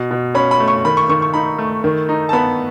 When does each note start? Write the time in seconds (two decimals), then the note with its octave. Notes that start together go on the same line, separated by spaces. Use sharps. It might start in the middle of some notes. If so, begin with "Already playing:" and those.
Already playing: B2
0.11 B2
0.35 C#4 B5
0.51 B5
0.60 A3
0.68 C#6
0.85 D#3 B5
0.97 C#6
1.09 D#3 C#6
1.22 C#6
1.34 D#4 B5
1.59 A3
1.84 D#3
2.09 D#4
2.29 A5
2.33 B3 B5